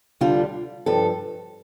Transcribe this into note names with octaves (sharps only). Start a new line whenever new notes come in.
D2 D3 G3 F4
G2 F3 A4